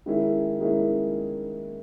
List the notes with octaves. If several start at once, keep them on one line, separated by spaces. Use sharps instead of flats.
D#3 G#3 C#4 E4
D#3 G#3 C#4 E4